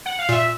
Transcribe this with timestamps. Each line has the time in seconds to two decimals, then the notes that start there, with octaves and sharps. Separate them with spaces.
0.06 F#5
0.19 F5
0.29 A#2 E5